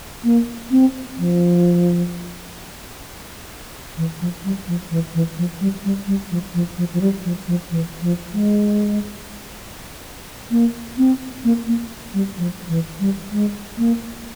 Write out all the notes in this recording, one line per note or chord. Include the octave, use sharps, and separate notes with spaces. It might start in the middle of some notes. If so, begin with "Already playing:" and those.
A#3
C4
F3
E3
F3
G3
F3
E3
E3
F3
G3
G3
G3
F3
F3
F3
F3
G3
F3
F3
E3
F3
G#3
A#3
C4
A#3
A#3
G3
F3
E3
G3
G#3
A#3